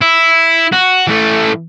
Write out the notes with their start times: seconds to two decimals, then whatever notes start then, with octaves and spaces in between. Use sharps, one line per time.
0.01 E4
0.73 F#4
1.08 E3 A3